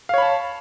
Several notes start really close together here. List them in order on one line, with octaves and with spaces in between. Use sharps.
F5 C#5 B5 A5